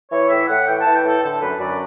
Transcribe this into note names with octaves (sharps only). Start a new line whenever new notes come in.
E3 C#5
A2 E5
A2 F#5
E3 G5
E3 A5
G5
A2 A4
D3 A4
F#2 B4
F#2 D5